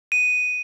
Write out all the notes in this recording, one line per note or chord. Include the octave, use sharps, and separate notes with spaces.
D#7